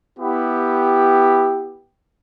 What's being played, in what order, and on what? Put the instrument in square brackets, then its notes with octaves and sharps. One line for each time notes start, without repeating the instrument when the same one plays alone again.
[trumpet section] B3 E4 G4